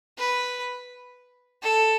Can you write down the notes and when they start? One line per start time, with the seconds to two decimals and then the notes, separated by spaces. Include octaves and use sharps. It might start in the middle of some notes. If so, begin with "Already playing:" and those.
0.18 B4
1.62 A4